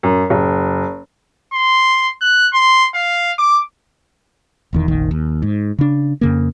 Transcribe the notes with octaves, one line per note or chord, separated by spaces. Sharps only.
F#2
F#1
C6
F#6
C6
F5
D6
E1 E2 D#3
F1 A#1 D#3
D#2
G#2
C#3 D4
F2 C#3 A#3